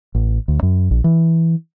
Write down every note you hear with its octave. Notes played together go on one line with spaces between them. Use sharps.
A1
D2
F#2
A#1
E3